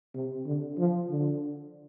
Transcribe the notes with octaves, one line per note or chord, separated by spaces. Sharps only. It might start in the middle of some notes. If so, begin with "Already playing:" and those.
C3
D3
F3
D3